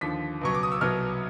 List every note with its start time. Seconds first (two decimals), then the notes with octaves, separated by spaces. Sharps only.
0.01 D#2 D3 F3 B6
0.41 C#2 B2 F#3 C#6
0.55 D6
0.63 D#6
0.72 E6
0.81 C2 B2 F#3 F6